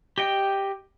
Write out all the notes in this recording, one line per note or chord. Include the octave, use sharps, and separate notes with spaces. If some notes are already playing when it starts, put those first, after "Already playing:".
G4 D#5 G5